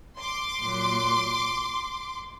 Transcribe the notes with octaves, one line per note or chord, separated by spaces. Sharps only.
C6 D6
A#2 F#3